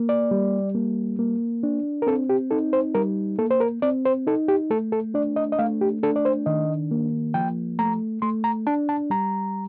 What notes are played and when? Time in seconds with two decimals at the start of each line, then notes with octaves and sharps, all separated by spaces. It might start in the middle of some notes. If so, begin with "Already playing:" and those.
Already playing: A#3
0.09 D5
0.31 G3
0.75 A#3
1.19 A#3
1.63 D4
2.02 A#4
2.07 C4 A4
2.30 G4
2.51 D#4 A4
2.73 C5
2.95 G3 A#4
3.38 A#3 A4
3.50 C5
3.60 A#4
3.82 C4 D5
4.05 C5
4.27 D#4 A4
4.48 G4
4.70 A3 A4
4.92 A4
5.14 D4 D5
5.36 D#5
5.52 D#5
5.59 A3 F5
5.81 G4
6.03 D4 A4
6.16 D5
6.25 C5
6.46 D#3 D#5
6.91 A#3
7.34 F3 G5
7.79 A3 A#5
8.22 A3 C6
8.44 A#5
8.67 D4 A5
8.89 A5
9.10 G3 A#5